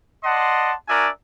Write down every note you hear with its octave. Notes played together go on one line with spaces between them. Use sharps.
D5 D#5 F#5 A5 C6
D4 F#4 A#4 D5 E5 G#5